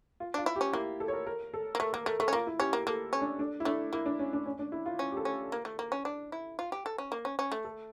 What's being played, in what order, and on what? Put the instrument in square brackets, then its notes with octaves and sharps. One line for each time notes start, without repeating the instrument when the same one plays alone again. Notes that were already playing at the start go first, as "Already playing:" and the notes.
[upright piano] F4
[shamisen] D4 [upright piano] F4
[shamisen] E4
[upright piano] G4
[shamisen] C#4
[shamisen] A#3 [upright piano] E4
[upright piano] A4
C#5
A#4
A#4
A4
[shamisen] A#3
[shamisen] A3 [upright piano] A#4
[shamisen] A#3 [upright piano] A#4
[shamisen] A3 [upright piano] A#4
[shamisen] A3 [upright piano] A4
[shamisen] C#4
[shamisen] A#3 [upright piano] F4
[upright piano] E4
[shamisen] C#4 [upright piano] G4
[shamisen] A#3
[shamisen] A#3 [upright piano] A4
[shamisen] C#4
[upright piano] D4
D4
E4
[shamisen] A3 [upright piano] D4
[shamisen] A#3 [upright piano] E4
[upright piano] D4
C#4
D4
C#4
D4
E4
F4
[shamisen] C#4
[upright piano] G4
A4
[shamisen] C#4
A#3
A3
A#3
C#4
D4
E4
F4
G4
A4
C#4
A#3
C#4
C#4
A3
[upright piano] A4